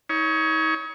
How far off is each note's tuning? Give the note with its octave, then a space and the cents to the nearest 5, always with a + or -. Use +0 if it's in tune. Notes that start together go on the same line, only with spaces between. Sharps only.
D#4 +40 C#5 +10